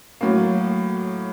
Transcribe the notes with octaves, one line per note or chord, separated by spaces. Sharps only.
A2 F#3 A#3